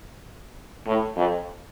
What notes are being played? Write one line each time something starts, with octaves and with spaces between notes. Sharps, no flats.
A2
F2